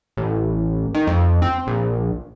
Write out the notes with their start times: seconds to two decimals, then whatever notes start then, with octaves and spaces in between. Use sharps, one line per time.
0.17 A1
0.94 D#3
1.07 F2
1.42 C4
1.67 A#1